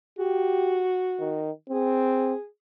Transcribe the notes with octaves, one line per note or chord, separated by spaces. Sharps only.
F#4 G4
D#3
C4 G#4